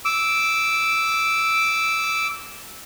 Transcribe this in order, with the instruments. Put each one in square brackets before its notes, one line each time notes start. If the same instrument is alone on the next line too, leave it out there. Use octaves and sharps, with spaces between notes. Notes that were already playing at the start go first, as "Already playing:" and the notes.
[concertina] D6 E6